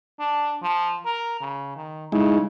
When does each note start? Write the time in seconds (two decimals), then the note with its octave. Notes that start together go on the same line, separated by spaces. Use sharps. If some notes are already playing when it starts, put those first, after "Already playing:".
0.20 D4
0.62 F3
1.05 A#4
1.41 C#3
1.76 D#3
2.12 C#3 G#3 D#4 E4